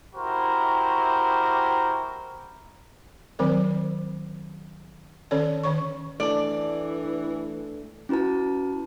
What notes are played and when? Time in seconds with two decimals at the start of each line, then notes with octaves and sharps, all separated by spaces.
0.15 E4 F#4 G4 A#4 C5
3.39 D#3 F#3 C4 A#4 C5 D5
5.31 D#3 C#4 A4 C#5 D5
5.64 D#3 C#5 C#6
6.20 E3 A3 D4 A4 D5
8.09 C#4 E4 F#4 B4 A5